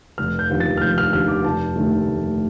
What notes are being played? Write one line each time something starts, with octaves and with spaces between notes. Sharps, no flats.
F1 F6
G6
D#2 D3 F3
A6
F6
F1 G6
F6
D#2 D3 F3 F6
D6
F1 A5
D#2 D3 A3
F1